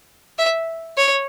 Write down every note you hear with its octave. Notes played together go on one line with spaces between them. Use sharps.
E5
C#5